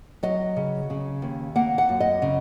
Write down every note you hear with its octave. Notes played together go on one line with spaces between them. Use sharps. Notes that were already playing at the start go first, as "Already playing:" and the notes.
F#3 D#5
C#3
C#3
D#2
A#3 F#5
F#5
F#2
D#5
C#3